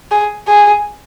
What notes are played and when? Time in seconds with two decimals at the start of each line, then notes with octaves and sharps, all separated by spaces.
0.11 G#4
0.47 G#4